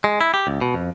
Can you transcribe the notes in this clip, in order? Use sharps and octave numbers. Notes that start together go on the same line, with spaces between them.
G#3
E4
G4
C#2
B2
F2